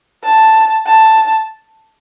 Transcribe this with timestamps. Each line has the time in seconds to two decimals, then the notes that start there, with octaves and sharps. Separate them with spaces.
0.24 A5
0.86 A5